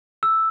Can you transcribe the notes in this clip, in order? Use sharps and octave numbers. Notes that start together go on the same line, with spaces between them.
E6